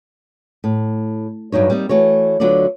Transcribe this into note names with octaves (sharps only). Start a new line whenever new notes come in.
A2
E2 G2 F#3 D#4 C#5
G3 A#3 C4 D#4
E3 A3 F#4 C#5
D2 D3 F#3 B3 F4 D5